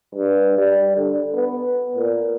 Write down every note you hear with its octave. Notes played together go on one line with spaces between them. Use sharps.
G2
G3
D3
B3
A#2